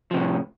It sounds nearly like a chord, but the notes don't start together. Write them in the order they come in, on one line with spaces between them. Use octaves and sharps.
F3 C3 A2